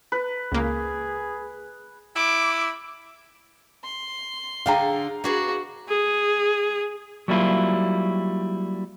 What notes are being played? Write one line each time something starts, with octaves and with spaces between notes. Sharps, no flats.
B4
C#2 A#3 G#4
E4 D6
C6
D3 D4 G#4 F5 G5 A#5
D4 F#4 G#4 B4
G#4
F#3 G3 A#3 E4 F4